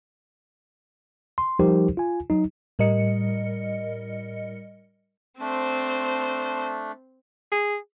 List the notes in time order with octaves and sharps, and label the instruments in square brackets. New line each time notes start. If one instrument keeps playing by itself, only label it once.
[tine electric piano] C6
F3 G3 D#4 G4 A#4 C5
F4 G#5
F#3 D#4
[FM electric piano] A2 G3 A#4 D#5 C#7
[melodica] A3 D4 [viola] C4 C5
[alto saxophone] G#4